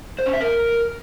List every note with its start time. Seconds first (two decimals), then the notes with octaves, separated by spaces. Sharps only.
0.19 C5
0.26 C#4
0.33 E5
0.41 A#4